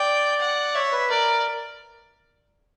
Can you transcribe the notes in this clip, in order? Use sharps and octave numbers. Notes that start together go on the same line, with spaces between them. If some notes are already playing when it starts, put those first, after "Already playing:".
Already playing: D5 G5
F#5
C#5 E5
B4
A#4 D5